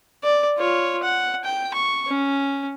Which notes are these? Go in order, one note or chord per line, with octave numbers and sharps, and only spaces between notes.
D5
F4 C#5
F#5
G5
C#6
C#4